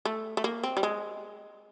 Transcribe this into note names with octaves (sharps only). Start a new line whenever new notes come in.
A3
A3
A#3
C4
G3
G#3